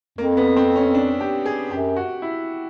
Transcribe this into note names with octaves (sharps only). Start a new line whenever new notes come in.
F2 A#3
B3
C4
C#4
D4
G4
G#4
F#2 G4
F#4
E4